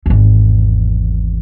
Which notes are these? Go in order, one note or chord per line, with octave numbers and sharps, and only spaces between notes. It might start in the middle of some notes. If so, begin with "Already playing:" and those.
G#1 E2